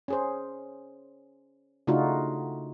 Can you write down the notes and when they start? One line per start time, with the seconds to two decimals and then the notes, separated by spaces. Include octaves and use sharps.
0.08 C#4 G#4 C5
1.87 C#3 A3 D4 D#4 F4 F#4